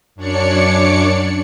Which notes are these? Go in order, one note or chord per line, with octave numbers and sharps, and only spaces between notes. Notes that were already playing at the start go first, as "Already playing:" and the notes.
F#2 D4 C#5 D5 C#7